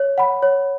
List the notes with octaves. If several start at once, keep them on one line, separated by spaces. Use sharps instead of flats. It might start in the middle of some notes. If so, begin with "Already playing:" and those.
Already playing: C#5
F#5 B5
C#5